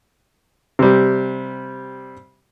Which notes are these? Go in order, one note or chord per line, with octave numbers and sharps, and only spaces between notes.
C3 G3